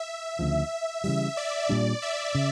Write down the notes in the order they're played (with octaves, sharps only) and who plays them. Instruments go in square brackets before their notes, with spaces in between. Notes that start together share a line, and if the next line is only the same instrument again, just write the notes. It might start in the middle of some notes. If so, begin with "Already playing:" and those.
Already playing: [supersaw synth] E5
[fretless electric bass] D2 C#3 F3
[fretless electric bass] C#3 E3 G3 [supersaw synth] E5
[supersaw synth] D5
[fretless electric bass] A#2 G3 D4
[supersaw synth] E5
[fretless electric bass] C#3